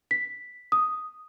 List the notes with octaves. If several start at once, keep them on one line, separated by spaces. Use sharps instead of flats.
B6
D#6